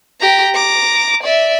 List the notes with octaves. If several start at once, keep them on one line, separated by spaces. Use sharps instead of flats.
G4 A#5
A#5 D6
D5 E5